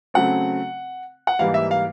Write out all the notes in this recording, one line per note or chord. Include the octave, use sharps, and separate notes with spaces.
C#3 F#3 A3 C4 F#5
F#5
G#2 E3 G3 A#3 F5
E5
F5